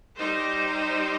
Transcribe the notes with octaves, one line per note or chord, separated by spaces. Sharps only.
G3 D#4 G4 C5